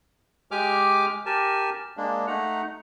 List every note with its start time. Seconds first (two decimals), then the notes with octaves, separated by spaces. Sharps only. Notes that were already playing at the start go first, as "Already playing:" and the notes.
0.51 G#3 G4 G#5 D6 F6
1.26 G4 A#4 G#5 A5
1.97 G#3 A#3 D4
2.27 A3 D#4 F#5 A#5